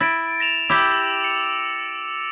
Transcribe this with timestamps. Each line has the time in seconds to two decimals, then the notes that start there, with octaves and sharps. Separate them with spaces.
0.01 E4 A6 A#6 D7
0.40 A#6 E7 F7
0.69 E4 G4 D6 E6
1.24 C#7